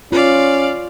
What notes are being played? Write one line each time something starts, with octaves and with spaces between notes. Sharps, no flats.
C#4 F4 D5 F5